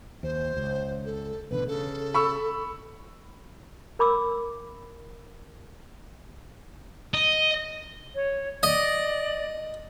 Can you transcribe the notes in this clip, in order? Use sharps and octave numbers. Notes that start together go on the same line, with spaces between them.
D#2 C5
C#2
A4
A1 B2 D3 B4
C#3 A4
B5 C#6 E6
A#4 B5 D6 E6
D#5
C#5
D5 D#5